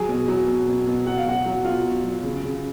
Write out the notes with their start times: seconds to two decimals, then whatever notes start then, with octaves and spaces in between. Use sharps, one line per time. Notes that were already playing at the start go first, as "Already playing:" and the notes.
Already playing: F#3 G#4 G#5
0.09 B2
0.28 F#3
0.47 B2
0.67 B2
0.87 B2
1.06 F#3 F#5
1.17 F5
1.25 B2 F#4 F#5
1.46 F#3
1.64 B2 F4 F5
1.84 B2
2.04 F#3
2.23 C#3
2.43 C#3